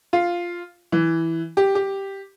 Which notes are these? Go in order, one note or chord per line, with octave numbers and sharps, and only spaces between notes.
F4
E3
G4
G4